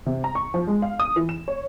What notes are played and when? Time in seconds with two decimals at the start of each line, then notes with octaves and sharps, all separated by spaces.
0.06 C3
0.24 A#5
0.35 C#6
0.54 F3
0.67 G#3
0.82 F5
1.00 D#6
1.16 E3
1.29 E7
1.48 C#5